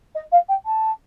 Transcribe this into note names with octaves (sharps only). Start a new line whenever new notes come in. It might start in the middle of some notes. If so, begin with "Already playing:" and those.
D#5
F5
G5
A5